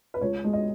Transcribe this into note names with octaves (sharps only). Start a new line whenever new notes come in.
B4
C#2 C#5
G#3
D#5